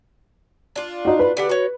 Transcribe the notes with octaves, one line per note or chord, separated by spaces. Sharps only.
D4 F4
D#4 F#4
B4
D3 G4 F#5
F#4 C#5